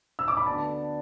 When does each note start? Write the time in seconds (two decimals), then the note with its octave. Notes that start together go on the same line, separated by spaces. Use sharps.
0.19 E6
0.28 D6
0.37 B5
0.46 D2 D3 B3 D4 A5